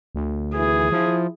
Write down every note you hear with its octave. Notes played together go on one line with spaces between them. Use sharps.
D2
E3 G#4
F3 E4